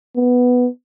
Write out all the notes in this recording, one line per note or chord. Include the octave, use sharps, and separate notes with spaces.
B3